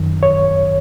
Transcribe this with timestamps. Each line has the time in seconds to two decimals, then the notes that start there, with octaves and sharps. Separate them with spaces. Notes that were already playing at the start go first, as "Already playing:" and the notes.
Already playing: F#2 D#3
0.23 C#5